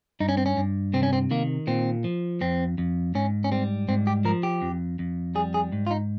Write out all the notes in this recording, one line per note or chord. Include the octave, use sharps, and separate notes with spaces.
G2 D#4
C#4
C4
C#4
G2
C3 C4
C#4
C4
D#3 A#3
A#2 C4
F3
F2 C4
F2
G#2 C#4
C#4
G3 C4
G#2 C4
G4
F3 A#4
G4
F2
F2
G3 G#4
G#4
G#2
F4
D#4